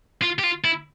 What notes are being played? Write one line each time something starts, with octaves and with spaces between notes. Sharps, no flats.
F4
G4
F4
E4